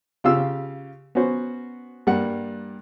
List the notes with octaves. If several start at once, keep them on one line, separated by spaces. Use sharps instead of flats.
C#3 F4 G4 F5 E6
B3 C#4 F#4 C5
G2 G3 A#3 F#5